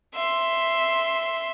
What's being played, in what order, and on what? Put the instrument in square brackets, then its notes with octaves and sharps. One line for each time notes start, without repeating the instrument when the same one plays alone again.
[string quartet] E5 C6